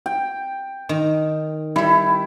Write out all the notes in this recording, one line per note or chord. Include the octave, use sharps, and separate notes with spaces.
G5
D#3
G3 E4 A4